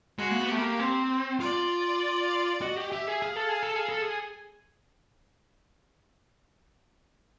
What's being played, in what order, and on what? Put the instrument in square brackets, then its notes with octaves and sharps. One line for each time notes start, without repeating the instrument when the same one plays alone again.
[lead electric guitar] G#3 [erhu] F#4
[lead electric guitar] A#3
B3
[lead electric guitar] A3 [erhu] G4
[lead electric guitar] A#3
C4
[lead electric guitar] F4 [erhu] D5
[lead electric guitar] F#4 [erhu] D#5
[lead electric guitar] G4
[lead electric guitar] G4 [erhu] E5
[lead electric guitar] G#4
[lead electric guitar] G#4 [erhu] F5
[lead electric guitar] A4
[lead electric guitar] G#4 [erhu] F5
[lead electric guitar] A4
G#4
A4
G#4